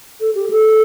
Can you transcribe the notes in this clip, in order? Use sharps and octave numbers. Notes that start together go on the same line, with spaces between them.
A4
G4
A4